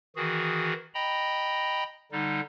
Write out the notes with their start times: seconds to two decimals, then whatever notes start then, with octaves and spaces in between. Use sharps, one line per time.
0.16 D#3 E3 F#4 G#4
0.94 D#5 G5 A#5 B5
2.12 D3 G3 D#4